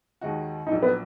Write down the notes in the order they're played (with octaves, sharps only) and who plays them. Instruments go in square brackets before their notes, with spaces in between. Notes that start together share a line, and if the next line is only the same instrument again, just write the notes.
[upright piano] D#2 D#3 G#3 D#4 F#4
[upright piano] A#1 A#2 F#3 A#3 [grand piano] D#4
[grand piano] B3